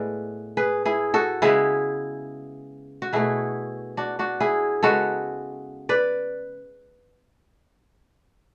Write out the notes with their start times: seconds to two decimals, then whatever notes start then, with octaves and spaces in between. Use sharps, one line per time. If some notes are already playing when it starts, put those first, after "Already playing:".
Already playing: A2 G#3 B3 B4 D5
0.57 G#4 B4
0.85 E4 G#4
1.14 F#4 A4
1.42 C#3 G#3 B3 E4 G#4
3.02 F#4
3.13 B2 A3 E4 G#4
3.97 D4 F#4
4.19 D4 F#4
4.40 E4 G#4
4.83 C#3 G#3 B3 F#4 A4
5.89 B4 D5